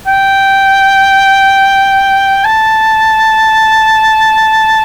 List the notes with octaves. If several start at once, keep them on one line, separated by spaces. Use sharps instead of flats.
G5
A5